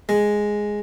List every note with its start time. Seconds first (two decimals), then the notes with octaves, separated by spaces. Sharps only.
0.09 G#3